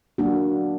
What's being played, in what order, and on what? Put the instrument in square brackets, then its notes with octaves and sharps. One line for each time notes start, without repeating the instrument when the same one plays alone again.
[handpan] F#3 A#3 D4 F#4